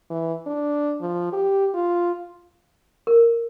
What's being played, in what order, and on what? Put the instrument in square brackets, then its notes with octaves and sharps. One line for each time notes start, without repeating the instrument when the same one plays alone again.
[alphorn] E3
D4
F3
G4
F4
[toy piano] A#4